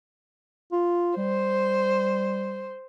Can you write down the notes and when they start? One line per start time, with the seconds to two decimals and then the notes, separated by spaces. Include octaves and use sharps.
0.72 F4
1.17 G3 C5